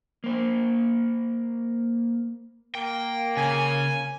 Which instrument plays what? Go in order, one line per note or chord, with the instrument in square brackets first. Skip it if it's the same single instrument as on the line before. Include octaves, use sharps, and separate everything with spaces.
[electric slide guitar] A#3 C5
[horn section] A#3 [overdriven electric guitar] G5
[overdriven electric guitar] C#3 [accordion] G#5